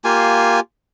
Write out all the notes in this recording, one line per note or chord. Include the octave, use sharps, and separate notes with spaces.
A#3 F4 G4 G#5